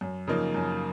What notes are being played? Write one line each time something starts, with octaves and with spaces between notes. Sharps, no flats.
F#2
C#3 F3 A#3 D#4
F#2